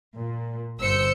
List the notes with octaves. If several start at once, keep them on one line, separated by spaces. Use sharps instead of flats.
A#2
G1 C5 E6 G6 C#7